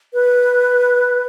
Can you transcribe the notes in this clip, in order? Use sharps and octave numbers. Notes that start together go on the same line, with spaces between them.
B4